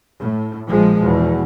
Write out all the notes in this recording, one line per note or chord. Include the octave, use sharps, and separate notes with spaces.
A2
A#1 A#2 F3 G#3
E2 B2